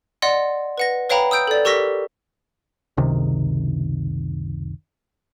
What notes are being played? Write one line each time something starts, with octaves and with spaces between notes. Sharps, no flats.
D5 D#5 F#5 C6
B4 F#5 A#6
B4 C#5 F5 G5 A#5 B5
D#6 E6 G6 D7
A4 D5
G4 A#4 C#6 E6 A#6 B6
F#1 C#2 C3 D#3